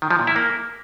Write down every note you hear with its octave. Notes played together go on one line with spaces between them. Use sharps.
D#3
F3
A#2
E4
A#3